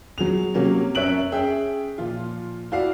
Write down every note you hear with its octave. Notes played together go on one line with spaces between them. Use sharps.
F#3 G#4 F7
C3 F#3 A#3 C#4
F#2 C#5 E5 F#6 D7 F#7
C#4 G#4 E5 G5
A#2 F3 F4
E4 F#4 D5 F5